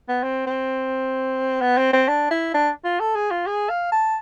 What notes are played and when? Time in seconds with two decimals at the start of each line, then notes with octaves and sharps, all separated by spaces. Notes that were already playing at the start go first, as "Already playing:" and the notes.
0.08 B3
0.23 C4
0.47 C4
1.61 B3
1.77 C4
1.93 C4
2.08 D4
2.31 E4
2.54 D4
2.85 F4
3.00 A4
3.15 G#4
3.31 F4
3.47 G#4
3.69 F5
3.92 A5